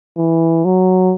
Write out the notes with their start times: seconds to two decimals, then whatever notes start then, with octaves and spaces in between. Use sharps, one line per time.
0.17 E3
0.65 F#3